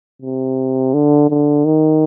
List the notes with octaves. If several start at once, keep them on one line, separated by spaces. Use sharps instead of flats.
C3
D3
D3
D#3